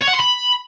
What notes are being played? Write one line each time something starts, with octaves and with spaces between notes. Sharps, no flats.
C#5
F#5
C6
B5